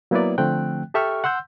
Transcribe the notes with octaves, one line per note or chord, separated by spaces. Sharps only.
F#3 A#3 B3 E4 B4 D5
D3 F3 A3 C4 G5 F#6
G4 A4 E5 G5 C#6 F6
F#5 C6 E6 G6